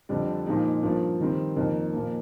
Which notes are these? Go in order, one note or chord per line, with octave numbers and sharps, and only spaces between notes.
F2 D3 G3 D4
A#2 F3 G#3 D#4
G2 F3 A#3
D#3 G3 C4
F2 D#3 A#3
A#2 F3 A#3